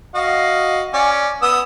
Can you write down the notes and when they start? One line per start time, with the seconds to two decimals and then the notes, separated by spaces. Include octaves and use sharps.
0.15 F#4 D#5 F5
0.94 C#4 D5
1.42 B3 D#6 E6